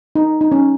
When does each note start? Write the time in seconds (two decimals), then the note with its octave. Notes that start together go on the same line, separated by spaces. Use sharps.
0.15 D#4
0.41 D#4
0.52 C#4